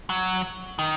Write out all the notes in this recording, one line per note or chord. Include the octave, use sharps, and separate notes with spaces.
F#3
D#3